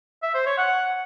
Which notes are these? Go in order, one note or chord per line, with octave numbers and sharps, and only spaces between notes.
E5
C5
C#5
F#5